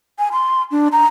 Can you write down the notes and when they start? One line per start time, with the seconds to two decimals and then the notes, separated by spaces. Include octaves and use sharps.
0.19 G#5
0.32 C6
0.71 D4
0.92 A#5